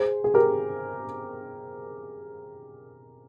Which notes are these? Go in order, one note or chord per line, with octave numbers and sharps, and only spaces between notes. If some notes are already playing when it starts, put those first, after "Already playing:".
Already playing: G#4 C5
G#4
G4 A#4